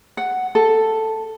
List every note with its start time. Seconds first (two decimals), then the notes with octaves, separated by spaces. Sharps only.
0.17 F#5
0.55 A4